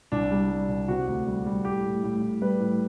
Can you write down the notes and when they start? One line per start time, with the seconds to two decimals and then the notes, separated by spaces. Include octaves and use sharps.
0.12 C2 D4
0.31 G3
0.50 G3
0.69 C2
0.88 C3 F#4
1.07 D2
1.26 G3
1.46 G3
1.65 A2 G4
1.84 A2
2.03 A2
2.22 A2
2.42 G3 B4
2.60 A2